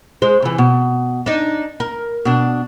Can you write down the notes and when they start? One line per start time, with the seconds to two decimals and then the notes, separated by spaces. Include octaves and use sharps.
0.22 G#3 C5
0.42 C3 E3
0.58 B2
1.26 D4 D#4
1.80 A#4
2.25 B2 D4